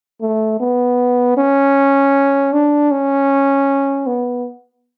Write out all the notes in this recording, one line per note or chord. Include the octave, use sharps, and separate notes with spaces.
A3
B3
C#4
D4
C#4
B3